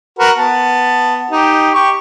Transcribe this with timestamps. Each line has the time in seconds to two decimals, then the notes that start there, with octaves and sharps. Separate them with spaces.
0.19 F#4 A#4 B4
0.38 B3 A5
1.31 D#4 G4
1.74 G4 C#6